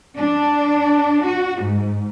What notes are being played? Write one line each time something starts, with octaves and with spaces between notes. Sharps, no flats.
D4
F#4
G#2